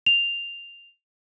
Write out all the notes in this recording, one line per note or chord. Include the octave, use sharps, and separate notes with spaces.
F7